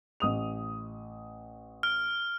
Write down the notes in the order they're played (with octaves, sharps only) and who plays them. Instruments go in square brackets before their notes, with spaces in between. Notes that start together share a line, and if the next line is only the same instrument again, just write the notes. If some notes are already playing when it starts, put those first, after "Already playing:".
[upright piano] A1 D#6 F7
[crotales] F6